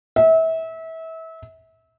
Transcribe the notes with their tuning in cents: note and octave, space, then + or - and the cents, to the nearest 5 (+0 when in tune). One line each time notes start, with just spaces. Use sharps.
E5 -30